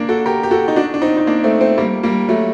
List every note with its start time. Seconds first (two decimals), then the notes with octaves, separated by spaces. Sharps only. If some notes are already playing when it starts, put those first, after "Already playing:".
Already playing: A#3 D4
0.09 F#4 A4
0.26 G4 A#4
0.43 G4
0.51 F#4 A4
0.68 D#4
0.76 D4 F#4
0.94 D4
1.02 C4 D#4
1.17 D#4
1.27 A#3 D4
1.44 A3 C4
1.61 A3 C4
1.78 G3 A#3
2.03 G3 A#3
2.29 F#3 A3